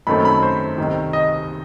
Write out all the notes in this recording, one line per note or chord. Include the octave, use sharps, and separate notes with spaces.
F#2 D#3 A3 C4 B5
B5
C5
C2 C3 D#3
D#5